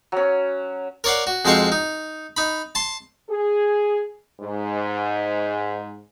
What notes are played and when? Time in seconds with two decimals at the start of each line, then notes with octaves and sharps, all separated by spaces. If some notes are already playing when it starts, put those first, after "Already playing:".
0.12 F#3 C#4
1.04 A#4 C#5 D5 F5 F#5
1.27 F#4
1.45 F2 G#3 F#4 C5 F5 C#6
1.72 D#4
2.37 D#4 B5
2.75 A5 C6
3.29 G#4
4.41 G#2